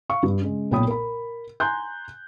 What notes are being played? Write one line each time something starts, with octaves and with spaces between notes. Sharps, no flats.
F5 C#6
G2
C#3 G#3
B1 A#2 C#5 G5 B5 D#6
A#4 B5
G#5 A#5 C6 F#6 G6